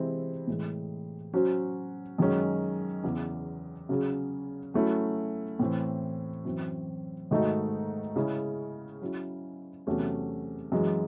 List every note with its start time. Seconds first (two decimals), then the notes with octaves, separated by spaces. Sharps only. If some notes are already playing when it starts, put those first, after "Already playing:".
Already playing: C3 E3 G#3 C4 E4
0.47 A2 E3 G#3
1.33 F#3 C#4 F#4 C5
2.18 F#2 D#3 G#3 C#4
3.04 E2 C#3 E3
3.89 C#3 F#3 C#4 G#4
4.74 F#3 A3 C#4 E4
5.59 A2 E3 C4
6.45 F#2 E3 C4
7.31 G#2 D#3 A3 D#4 F#4
8.16 C#3 G#3 C#4 E4 G#4
9.02 F#3 C#4 E4
9.87 E2 C3 F#3 A3 C#4
10.72 F#2 E3 G#3